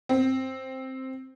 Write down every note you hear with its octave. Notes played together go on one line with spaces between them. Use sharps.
C4